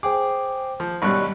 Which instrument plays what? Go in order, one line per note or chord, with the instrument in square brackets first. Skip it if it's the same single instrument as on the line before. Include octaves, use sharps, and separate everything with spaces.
[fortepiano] G#4 [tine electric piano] C5 G5 D6
[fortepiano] F3
[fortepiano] G#1 B2 C#4 [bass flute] G3 [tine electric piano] B5 C#6 F#6